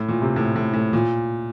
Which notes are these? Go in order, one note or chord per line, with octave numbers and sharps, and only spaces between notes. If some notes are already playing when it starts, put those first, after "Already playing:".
Already playing: A2
A#2
C3
A2
A2
A2
A#2